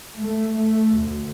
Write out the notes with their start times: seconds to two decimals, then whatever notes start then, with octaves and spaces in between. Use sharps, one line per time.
0.17 A3
0.53 A3
0.94 D2